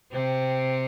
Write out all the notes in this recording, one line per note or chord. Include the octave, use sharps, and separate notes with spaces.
C3 C4